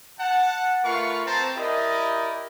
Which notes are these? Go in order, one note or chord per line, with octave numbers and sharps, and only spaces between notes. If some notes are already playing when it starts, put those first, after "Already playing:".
F#5 A5
A3 F4 A#4 B4 F5 C#6
C4 A5 A#5
E4 G4 A#4 D5 D#5